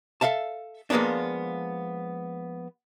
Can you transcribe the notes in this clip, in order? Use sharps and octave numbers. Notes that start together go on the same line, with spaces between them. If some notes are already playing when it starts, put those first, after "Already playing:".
A4 A#4 E5 F5 A5
F3 G#3 A#3 B3 D4